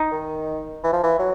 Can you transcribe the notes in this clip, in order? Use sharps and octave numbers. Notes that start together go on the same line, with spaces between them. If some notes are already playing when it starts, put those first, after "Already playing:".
Already playing: D#4
D#3
E3
F3
E3
F#3